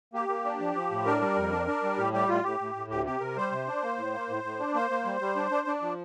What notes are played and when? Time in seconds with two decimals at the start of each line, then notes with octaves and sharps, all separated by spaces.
0.14 A#3 G4
0.28 A#3
0.45 D4
0.60 F3
0.75 F3
0.91 A2
1.05 D4 A#4
1.21 G3
1.36 F2
1.51 D4
1.67 D4
1.83 G3
1.98 A2 G4
2.13 G3 G4
2.28 A2 F4
2.44 A2 G4
2.59 A2
2.75 A2
2.90 D2 G4
3.06 C3 G4
3.21 C3 A#4
3.37 G3 C5
3.52 C3
3.67 D4
3.83 A#3
3.97 A2
4.14 A#3
4.29 A2
4.43 A2
4.59 D4
4.75 A#3 C5
4.90 A#3
5.05 G3
5.21 G3
5.36 D4
5.51 D4
5.67 D4
5.82 F3